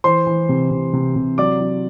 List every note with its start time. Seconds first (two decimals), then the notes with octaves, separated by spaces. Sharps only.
0.04 E3 C5 C6
0.27 E3
0.49 C3
0.71 C3
0.93 C3
1.16 C3
1.38 F#3 D5 D6
1.60 F#3